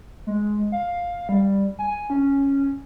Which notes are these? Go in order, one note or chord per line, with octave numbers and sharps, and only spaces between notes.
G#3
F5
G3
G#5
C#4